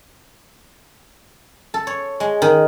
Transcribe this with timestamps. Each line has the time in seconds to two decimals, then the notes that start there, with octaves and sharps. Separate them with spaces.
1.74 A4
1.87 C#5
2.20 G#3
2.42 D#3